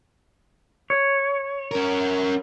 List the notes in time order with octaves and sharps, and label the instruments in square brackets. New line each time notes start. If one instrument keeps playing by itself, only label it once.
[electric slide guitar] C#5
[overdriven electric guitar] C#4 A#4